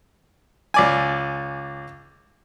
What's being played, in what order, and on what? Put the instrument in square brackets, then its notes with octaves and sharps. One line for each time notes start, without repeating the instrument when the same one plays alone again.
[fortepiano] C#2 D5 G#5